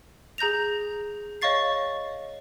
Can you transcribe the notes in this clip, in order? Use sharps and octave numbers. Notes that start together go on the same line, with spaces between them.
G#4 A#5 G6 A#6 F7
C#5 D#5 F5 C#6 A6 C7